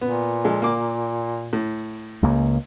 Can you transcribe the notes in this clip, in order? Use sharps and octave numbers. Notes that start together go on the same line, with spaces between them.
A#2 B3
F3 G#3 A4
A#3 D6
A2
C#2 C#3 A#3